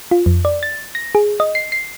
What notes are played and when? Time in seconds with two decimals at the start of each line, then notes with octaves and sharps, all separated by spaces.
0.11 F4
0.26 F2
0.45 D5
0.63 A6
0.95 A#6
1.15 G#4
1.40 D#5
1.55 C7
1.72 C7